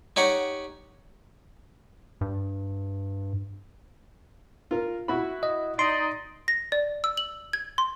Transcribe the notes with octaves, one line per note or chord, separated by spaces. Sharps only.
D#4 G4 C#5 F#5
G2
F4 A#4
E4 F#4 B5
D#5
D#4 D5 D#5 C6
A#6
D5
E6
F#7
G#6
C6